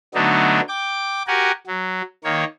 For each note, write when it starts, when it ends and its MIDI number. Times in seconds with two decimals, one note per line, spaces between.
0.14 0.60 50
0.14 0.60 54
0.14 0.60 57
0.14 0.60 59
0.14 0.60 62
0.14 0.60 63
0.68 1.22 79
0.68 1.22 86
1.27 1.51 66
1.27 1.51 67
1.27 1.51 70
1.27 1.51 78
1.27 1.51 80
1.67 2.02 54
2.24 2.44 51
2.24 2.44 58
2.24 2.44 73